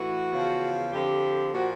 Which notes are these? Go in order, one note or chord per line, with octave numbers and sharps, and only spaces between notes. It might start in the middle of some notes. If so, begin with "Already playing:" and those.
Already playing: A2 E3 F#4
E2 C#3 F3
F2 D3 F3 G4
A#2 F3 F#4